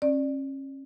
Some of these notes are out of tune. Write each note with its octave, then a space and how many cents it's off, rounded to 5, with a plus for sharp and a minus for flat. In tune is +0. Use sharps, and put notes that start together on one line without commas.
C#4 -35 D5 +15